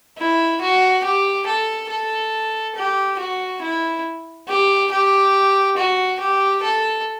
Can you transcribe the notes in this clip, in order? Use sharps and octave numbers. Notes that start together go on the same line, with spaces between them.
E4
F#4
G4
A4
A4
G4
F#4
E4
G4
G4
F#4
G4
A4